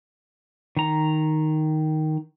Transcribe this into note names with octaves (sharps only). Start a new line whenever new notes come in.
D#3 A#5